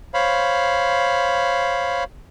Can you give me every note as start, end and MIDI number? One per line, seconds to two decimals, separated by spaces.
0.14 2.04 72
0.14 2.04 73
0.14 2.04 77
0.14 2.04 83